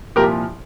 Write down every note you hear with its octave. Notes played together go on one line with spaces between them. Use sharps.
C2 A#2 F3 G4 A#4